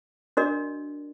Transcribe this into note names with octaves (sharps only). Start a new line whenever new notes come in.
D4 F#4 A#4 D5 D#5